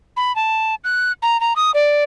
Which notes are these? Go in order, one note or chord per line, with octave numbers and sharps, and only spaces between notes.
B5
A5
F#6
A#5
A#5
D#6
D5